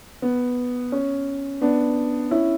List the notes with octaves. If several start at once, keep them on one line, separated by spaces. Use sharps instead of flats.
B3
C#4
B3 D4
C#4 E4